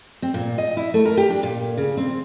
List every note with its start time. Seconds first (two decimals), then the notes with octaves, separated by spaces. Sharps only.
0.22 C4
0.34 A#2
0.58 D#5
0.77 E4
0.94 A3
1.05 A#4
1.17 G4
1.30 D4
1.43 A#2
1.77 C#3
1.97 C4